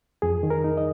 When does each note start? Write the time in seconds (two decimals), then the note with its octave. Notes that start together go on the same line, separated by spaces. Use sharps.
0.22 F2 G#4
0.43 D#3
0.50 A#4
0.64 D#4
0.77 D#5